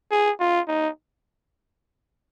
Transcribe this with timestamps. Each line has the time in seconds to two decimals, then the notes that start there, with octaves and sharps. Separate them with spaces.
0.11 G#4
0.40 F4
0.68 D#4